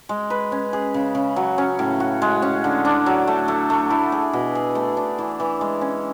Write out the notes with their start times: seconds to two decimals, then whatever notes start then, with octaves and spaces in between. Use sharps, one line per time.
0.09 G#3
0.30 B4
0.52 C#4
0.73 G#4
0.94 C#3
1.15 C#3
1.36 F#3
1.58 C#4
1.79 A2
2.00 F#4
2.22 G#3
2.42 C#4
2.64 D3
2.85 D4
3.06 F#3
3.27 A3
3.48 A3
3.70 A3
3.90 E4
4.12 G#4
4.33 B2
4.55 G#4
4.75 A3
4.97 D4
5.19 E3
5.40 E3
5.61 G#3
5.81 C#4